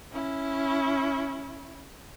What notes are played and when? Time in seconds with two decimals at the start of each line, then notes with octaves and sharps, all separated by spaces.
0.12 C#4 E4